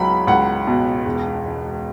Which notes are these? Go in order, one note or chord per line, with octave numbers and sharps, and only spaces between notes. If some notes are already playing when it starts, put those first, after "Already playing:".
Already playing: C#2 F#3 B5
C#2 F#5
B2
E1
E1